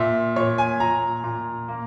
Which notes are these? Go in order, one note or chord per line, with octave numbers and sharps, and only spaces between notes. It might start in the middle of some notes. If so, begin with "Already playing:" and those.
Already playing: A#2 E5
A#2 C#5
G#5
A#2 A#5
A#2
A#3